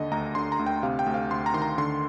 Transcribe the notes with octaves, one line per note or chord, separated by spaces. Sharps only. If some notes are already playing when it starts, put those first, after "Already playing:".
Already playing: D#2 D3 D#5
D2 A#5
D3 C6
A#5
D2
G5
C3 F5
G5
D2
F5
D2 C6
A#5
D#3 C6
A#5
D3 C6